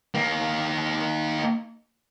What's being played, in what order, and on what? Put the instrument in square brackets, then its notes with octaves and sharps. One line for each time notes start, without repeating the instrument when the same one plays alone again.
[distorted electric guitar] D#3 A#3